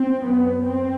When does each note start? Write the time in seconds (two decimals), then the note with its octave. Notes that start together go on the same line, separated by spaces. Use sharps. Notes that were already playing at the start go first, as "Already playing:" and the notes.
Already playing: C4
0.24 F#2 B3
0.66 C4